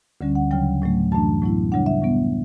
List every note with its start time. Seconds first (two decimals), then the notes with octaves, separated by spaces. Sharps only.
0.21 D2 D3 G3 C#4
0.35 F#5
0.51 D2 C#3 F#3 G5
0.82 A2 F#3 A3
1.12 F#2 E3 A3 D4 A5
1.42 A2 F#3 B3 E4
1.72 C#3 G3 D4 F#5
1.86 E5
2.02 A2 G3 B3